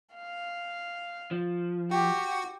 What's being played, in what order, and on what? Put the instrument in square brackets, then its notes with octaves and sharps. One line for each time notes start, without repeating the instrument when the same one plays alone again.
[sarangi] F5
[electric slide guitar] F3
[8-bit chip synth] F#4 [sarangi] G4